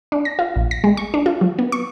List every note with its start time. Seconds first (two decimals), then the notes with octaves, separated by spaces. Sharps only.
0.12 D4
0.25 A#6
0.39 F4
0.56 A#1
0.71 A#6
0.84 G#3
0.97 C#6
1.14 D4
1.26 F4
1.41 F#3
1.59 B3
1.72 C#6